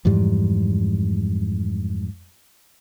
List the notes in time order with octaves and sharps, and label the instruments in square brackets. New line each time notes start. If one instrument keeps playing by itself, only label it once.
[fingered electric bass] F2 G#2 E3 G3